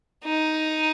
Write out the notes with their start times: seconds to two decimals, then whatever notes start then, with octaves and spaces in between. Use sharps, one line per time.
0.24 D#4